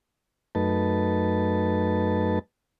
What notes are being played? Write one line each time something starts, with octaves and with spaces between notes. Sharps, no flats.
F#2 A3 D#4 B4 A5